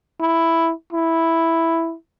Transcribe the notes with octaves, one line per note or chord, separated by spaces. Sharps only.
E4
E4